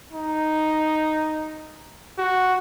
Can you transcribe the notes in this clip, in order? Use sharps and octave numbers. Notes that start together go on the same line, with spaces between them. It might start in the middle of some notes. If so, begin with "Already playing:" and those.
D#4
F#4